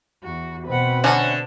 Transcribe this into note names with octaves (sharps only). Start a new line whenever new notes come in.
E2 F#4
B2 C4 B4 F#5
D3 A3 C#4 F#4